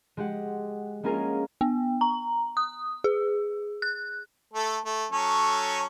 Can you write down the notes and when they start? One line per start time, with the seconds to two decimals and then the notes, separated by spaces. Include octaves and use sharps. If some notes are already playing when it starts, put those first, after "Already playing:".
0.17 G#3 G4 F#5
1.03 G#3 A#3 C#4 F4 G#4 A#4
1.61 B3
2.01 A#5
2.57 D#6
3.04 G#4
3.82 F#6
4.53 A3 A4
4.85 A3
5.12 F#3 C#4 A4